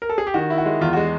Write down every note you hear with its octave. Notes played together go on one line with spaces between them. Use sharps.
A#4
A4
G#4
G4
D#3 F#4
E4
F#4
G#3
E2 F4
G#3 F#4